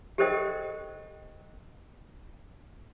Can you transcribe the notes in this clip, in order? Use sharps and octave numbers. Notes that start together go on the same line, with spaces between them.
G4 A4 A#4 C5 D#5 G5